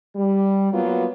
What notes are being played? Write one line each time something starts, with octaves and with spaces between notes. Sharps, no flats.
G3
F#3 A#3 B3 F4